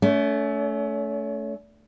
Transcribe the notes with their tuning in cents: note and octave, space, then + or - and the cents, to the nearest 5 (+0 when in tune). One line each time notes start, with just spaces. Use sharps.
A3 -10 C#4 +35